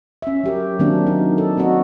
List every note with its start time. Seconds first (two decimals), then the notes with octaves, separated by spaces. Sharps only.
0.22 C#4 E5
0.44 F#3 G4 A#4
0.79 D#3 F#3 A#3 C4 D4
1.07 D#4
1.38 A4
1.57 A#3 C4 D4 F#4 D#5